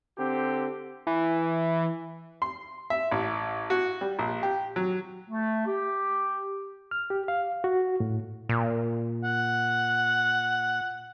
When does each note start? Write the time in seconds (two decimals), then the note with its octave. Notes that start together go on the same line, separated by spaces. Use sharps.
0.18 D3 C4 G4
1.07 E3
2.42 C6
2.90 E5
3.11 A1
3.70 F#4
4.01 G3
4.19 A#1
4.43 G4
4.76 F#3
5.29 A3
5.66 G4
6.91 F6
7.10 G4
7.28 F5
7.64 F#4
8.00 A2
8.49 A#2
9.24 F#5